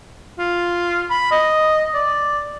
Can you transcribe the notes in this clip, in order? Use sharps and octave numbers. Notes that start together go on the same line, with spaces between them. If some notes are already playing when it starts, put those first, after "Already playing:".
F4
B5
D#5
D5